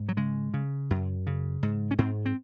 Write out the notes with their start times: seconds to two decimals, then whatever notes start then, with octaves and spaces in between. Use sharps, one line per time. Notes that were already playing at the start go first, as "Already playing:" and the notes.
Already playing: G#2
0.09 F#3
0.17 C#3 G#3
0.54 C#3
0.90 F#2
1.27 C#3
1.63 G#2
1.91 C#4
1.98 G#2 C4
2.26 C4